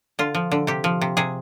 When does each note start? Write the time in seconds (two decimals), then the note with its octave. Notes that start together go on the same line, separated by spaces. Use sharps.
0.19 D3 F4
0.35 F3
0.52 D3
0.67 C3 G4
0.84 F3
1.01 C3
1.17 C3 G#4